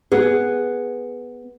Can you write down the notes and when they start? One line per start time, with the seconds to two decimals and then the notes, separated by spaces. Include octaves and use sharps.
0.12 B3 G#4